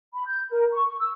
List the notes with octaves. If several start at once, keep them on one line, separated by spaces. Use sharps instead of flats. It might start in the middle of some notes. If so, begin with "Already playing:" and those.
B5
G6
A#4
C#6
E6